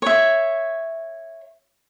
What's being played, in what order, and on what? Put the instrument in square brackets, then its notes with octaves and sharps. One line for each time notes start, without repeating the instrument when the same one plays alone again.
[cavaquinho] C#5 E5